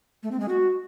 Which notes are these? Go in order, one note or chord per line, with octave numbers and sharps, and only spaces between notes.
A3
C4
G#3
F#4